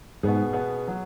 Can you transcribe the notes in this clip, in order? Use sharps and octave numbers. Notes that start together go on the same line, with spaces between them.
G#2 B2 B3 G#4
B2 B3 G#4
F#3